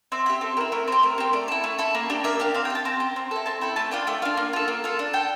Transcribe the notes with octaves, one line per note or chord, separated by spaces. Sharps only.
C4 E5
E4 G4 E5
C4 A4
E4 G4 A#4
A3 A#4
C4 G4 C5
A3 A#4
C4 G4
A3 D5
E4 A4
A3
E4 A4
A#3
D4 G4
A#3 E5
D4 G4 F5
C4 F5
G5
G4 A5
C4 A#5
G4
C4
E4 A4
C4 A5
E4 A4 G5
A3 A5
D4 F4 G5
A3 G5
D4 F4 F5
A#3
F4 A4
A#3
F4 A4
D4
A4 G5